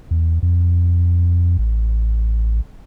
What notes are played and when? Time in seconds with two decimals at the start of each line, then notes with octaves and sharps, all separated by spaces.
0.11 E2
0.43 F2
1.59 A1